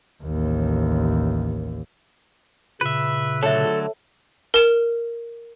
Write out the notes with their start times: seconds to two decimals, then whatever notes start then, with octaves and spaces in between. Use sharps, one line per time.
0.24 A1 D#2
2.81 A#2 C#3 B4 E5
3.43 D3 F#3 A3 A4 C#5 E5
4.54 A#4 E7